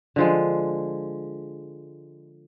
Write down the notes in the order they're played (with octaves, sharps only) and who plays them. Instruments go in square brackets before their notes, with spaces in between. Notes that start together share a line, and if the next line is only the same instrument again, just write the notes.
[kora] D3 F3 G#3